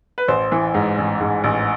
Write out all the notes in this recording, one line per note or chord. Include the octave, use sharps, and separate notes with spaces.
B4
A1 C5
E3
G#2
A1
G#2
A1